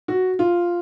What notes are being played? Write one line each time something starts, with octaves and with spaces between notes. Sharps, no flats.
F#4
F4